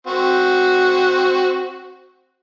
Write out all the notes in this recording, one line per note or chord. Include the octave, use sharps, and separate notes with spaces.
C4 F#4